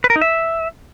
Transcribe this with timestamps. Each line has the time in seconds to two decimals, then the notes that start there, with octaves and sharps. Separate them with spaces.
0.04 B4
0.10 A#4
0.16 D#4
0.21 E5